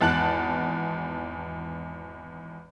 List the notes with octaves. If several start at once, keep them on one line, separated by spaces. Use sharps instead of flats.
G#1 E2 A5 F#6 F#7